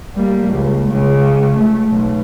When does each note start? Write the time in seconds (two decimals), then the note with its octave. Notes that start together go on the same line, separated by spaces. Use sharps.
0.15 G3 A#3
0.48 C#2
0.90 C#2 C#3
1.56 A3
1.90 B1